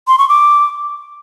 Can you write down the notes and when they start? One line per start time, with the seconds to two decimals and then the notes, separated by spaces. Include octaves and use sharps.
0.08 C6
0.18 C#6
0.29 D6